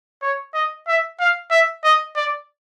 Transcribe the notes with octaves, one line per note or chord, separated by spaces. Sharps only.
C#5
D#5
E5
F5
E5
D#5
D5